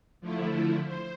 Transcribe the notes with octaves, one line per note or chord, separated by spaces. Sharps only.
D3 F3 A3 E4
C5